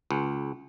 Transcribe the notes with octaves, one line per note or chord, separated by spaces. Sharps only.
C#2